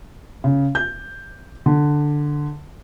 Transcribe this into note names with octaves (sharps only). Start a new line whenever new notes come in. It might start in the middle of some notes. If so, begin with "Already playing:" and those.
C#3
G6
D3